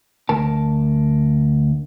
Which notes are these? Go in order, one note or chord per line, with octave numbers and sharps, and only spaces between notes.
D2 A#4 A5